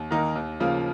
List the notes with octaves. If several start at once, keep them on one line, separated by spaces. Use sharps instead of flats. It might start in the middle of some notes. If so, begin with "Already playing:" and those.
Already playing: D#2
D#3 A#3 D#4 A#4
D#2
C#3 F3 A#3